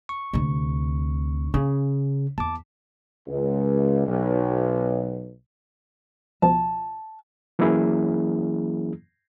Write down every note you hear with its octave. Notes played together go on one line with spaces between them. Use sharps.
C#6
D2 C3
C#3 C#4
E2 A5 D6
C#2
B1
C#2 B2 F3 A5
E3 F#3 A#3 C#4 E4 G#4